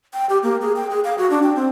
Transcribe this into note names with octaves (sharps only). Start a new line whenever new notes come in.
G5
G4
A#3
G#4
G5
G#4
F5
F#4
D4
G5
C4